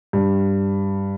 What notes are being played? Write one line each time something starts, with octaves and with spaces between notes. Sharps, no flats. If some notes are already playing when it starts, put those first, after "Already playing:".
G2